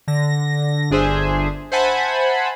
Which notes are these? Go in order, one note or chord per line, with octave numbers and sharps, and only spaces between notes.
D3 A#6
G1 D4 G#4 C5 E5
C5 E5 F#5 G#5 A5 B5